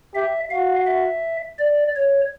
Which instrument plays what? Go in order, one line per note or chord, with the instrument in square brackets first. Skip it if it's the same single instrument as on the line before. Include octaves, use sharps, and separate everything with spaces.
[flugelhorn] G4 [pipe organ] E5
[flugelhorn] F#4 [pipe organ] F5
[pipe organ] E5
D5
C#5